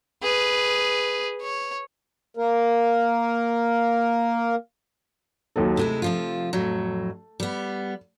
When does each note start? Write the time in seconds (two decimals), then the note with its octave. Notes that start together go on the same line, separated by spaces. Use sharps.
0.23 G#4 B4
1.41 C#5
2.37 A#3 A#4
5.56 D#2 F#3 A4
5.77 C3 G#3 A3 E4
6.02 C3 F3 F4
6.53 F2 A2 F#3
7.40 G3 B3